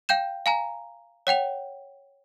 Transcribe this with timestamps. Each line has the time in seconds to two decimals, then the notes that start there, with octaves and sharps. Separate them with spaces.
0.09 F5 G5 G6 E7
0.46 F5 G#5 A#5
1.27 C#5 F#5 G5 F7